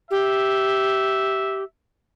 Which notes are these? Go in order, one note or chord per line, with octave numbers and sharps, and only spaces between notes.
G4 E5